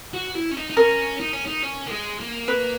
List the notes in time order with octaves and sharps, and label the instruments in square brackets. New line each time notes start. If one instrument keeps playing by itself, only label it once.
[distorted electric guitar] F#4
E4
C#4
D#4
D#4
[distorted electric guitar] C#4 [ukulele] A#4
[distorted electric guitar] D#4
C#4
D#4
C#4
A#3
G#3
A#3
[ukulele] B4